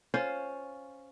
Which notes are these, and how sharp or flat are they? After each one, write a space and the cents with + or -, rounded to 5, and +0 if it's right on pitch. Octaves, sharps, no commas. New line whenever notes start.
C#4 +0 F4 +5 C5 +0